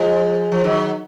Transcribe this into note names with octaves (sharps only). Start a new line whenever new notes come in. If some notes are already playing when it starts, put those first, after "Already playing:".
Already playing: F3 G#3
F3
D#3 F#3